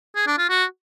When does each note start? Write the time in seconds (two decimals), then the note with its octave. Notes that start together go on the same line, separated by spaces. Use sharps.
0.15 G#4
0.27 D4
0.38 F4
0.49 F#4